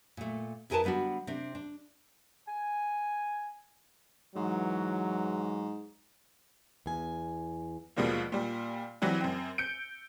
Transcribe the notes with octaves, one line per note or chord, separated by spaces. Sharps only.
A#2 A3
F2 E4 G#4 A#4 B4 A5
D3 G3 B3 D4 F#4
C3 C4 D4
D4
G#5
G#2 E3 F#3
E2 G#5
D#2 B2 F3 G3 G#3 A#3
A#2 G3
E3 F#3 G3 C4
F#2 C4
G6 C#7 D7